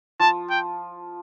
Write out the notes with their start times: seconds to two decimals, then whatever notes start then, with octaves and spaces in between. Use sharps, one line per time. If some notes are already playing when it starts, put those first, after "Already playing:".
0.20 F3 A5
0.50 G5